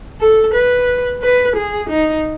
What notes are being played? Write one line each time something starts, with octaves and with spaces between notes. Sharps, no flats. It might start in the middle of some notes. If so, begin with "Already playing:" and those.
A4
B4
B4
G#4
D#4